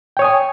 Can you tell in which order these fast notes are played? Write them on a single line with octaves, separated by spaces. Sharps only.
G5 C#5 D#6 G#5